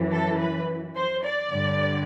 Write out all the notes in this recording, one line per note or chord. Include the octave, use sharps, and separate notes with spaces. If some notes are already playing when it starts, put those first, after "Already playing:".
Already playing: F#2 E3
A4
B4
C5
D5
G2 D3